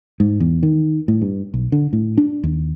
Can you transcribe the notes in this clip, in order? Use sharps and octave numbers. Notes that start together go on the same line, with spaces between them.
G#2
E2
D#3
A2
G2
B1
D3
A2
D4
D#2